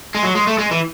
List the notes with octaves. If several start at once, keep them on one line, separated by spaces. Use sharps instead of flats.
G#3
F#3
G#3
A3
G#3
E3